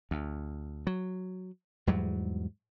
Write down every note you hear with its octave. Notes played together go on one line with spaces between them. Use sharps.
D2
F#3
E2 G#2 F#3 G3